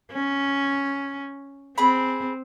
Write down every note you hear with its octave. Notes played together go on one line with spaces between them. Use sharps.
C#4
C4 G#4 B5